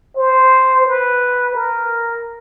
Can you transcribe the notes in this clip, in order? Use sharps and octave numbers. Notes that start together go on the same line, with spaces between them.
C5
B4
A#4